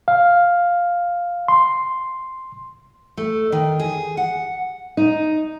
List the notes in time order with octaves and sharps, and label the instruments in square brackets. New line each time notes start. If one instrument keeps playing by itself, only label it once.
[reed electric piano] F5
C6
[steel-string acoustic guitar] A3
D#3
G#4
F#5
D#4